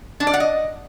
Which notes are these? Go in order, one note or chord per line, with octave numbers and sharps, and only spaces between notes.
D4
D5
F#5
D#5